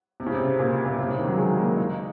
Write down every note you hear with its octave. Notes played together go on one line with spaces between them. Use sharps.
C3
C#3
C3
A#2
A#2
C3
C#3
D#3
F#3
G#3
A#3
D#4